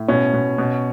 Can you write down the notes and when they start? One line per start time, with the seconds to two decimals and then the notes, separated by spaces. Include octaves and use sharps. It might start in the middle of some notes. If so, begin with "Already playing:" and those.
Already playing: A2
0.08 B2 C#4
0.33 B2
0.58 B2